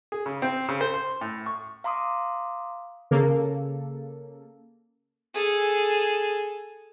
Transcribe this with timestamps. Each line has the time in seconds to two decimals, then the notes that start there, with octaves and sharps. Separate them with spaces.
0.12 G#4
0.26 C#3
0.42 C4
0.69 C#3
0.81 C5
0.94 C6
1.21 A2
1.46 C#6
1.84 F5 A#5 C6 D6 D#6
3.11 C#3 A#3 A4
5.34 G#4 A4